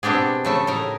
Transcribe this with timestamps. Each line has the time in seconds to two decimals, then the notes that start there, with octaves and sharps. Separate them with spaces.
0.03 B2 C4 D4 G4 G#4
0.45 C#3 A3 E5
0.67 A2 D#4 A#4